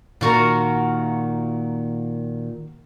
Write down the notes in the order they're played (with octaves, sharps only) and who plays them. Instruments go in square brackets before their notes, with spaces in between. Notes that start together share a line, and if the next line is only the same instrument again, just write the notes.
[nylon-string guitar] A#2 D#3 [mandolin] F4 F#4 A#4